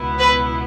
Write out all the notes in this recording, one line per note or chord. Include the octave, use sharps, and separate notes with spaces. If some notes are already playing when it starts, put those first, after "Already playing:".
Already playing: C#2 B2 B3 E4
B4